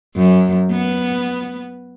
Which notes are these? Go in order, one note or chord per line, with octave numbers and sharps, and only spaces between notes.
F#2
B3